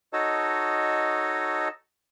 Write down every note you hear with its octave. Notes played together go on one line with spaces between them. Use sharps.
D#4 F#4 A4 C#5 D#5 A5